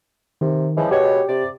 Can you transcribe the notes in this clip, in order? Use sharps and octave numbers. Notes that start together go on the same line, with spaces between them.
C3 D#3
C#3 E3 F3 G#3
B2 G4 C#5
C3 D5